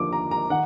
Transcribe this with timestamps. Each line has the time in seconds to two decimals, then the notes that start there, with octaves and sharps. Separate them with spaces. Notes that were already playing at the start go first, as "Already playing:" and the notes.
Already playing: D#2 D3 F3 D6
0.12 A#5
0.31 A#5
0.50 D#3 F#5